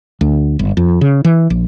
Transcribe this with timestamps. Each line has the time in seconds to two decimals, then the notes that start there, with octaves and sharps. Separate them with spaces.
0.21 D2
0.59 G1
0.77 F2
1.01 C#3
1.25 E3
1.50 A#1